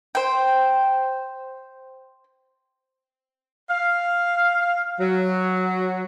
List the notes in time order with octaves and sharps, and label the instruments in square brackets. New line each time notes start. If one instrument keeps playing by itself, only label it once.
[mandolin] C5 G5
[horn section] F5
F#3